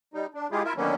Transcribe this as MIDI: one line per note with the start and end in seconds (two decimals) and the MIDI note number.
0.14 0.26 55
0.14 0.26 63
0.34 0.47 62
0.51 0.63 56
0.51 0.63 64
0.51 0.63 65
0.51 0.63 67
0.51 0.63 68
0.64 0.73 64
0.64 0.73 65
0.64 0.73 70
0.64 0.73 76
0.77 0.95 50
0.77 0.95 51
0.77 0.95 54
0.77 0.95 58
0.77 0.95 59
0.77 0.95 61